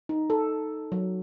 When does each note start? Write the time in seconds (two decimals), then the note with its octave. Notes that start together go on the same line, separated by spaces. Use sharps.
0.09 D#4
0.30 A4
0.92 F#3